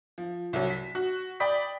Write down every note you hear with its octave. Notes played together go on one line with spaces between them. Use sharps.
F3
C2 F#3
B6
F#4
D5 G5 B5 D#6 B6